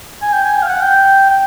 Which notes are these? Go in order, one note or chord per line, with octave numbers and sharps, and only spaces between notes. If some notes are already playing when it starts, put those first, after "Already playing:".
G#5
G5
G#5
G5
F5
F#5
G5
G5